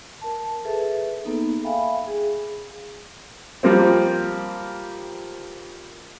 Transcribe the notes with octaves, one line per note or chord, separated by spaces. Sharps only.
A#4 A5
G#4 A4 B4 E5
A#3 B3 D#4 A4
E5 F5 G5 G#5 B5
G#4
F3 G3 A#3 C4